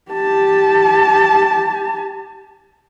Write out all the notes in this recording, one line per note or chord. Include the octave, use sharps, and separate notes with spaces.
G4 A5